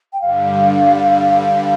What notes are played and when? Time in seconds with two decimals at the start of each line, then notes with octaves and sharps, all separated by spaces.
0.13 G5
0.21 G2 D3 G3 F5